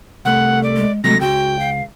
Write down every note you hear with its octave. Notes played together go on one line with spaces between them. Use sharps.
C2 A3 F#5
D5
G#3
C3 F#3 G#3 A3 A#6
C#2 F#4 G5
F5